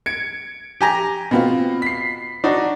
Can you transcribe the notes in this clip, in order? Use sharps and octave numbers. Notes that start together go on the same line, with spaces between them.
G#6 C#7 D7
G4 G#5 A#5
B2 B3 C4 F4
B6 C7
D4 D#4 F#4